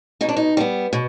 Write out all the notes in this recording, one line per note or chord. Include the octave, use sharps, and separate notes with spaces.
B2 D#4
D4
D#4
G3 B3
B2